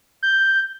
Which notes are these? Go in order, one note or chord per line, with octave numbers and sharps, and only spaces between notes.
G6